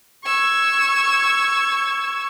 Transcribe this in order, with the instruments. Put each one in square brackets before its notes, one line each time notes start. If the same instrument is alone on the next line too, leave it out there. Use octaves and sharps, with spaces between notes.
[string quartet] C#6 E6 G#6